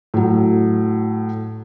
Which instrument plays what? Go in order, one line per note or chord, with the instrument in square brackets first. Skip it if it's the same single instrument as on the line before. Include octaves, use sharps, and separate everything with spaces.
[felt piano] A2 F#3